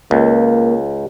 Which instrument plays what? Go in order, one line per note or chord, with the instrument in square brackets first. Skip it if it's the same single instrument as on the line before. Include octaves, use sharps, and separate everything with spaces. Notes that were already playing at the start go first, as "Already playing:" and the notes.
[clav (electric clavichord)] C#2 [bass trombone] A#3